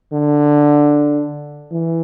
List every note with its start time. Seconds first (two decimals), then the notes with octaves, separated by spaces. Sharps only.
0.13 D3
1.72 E3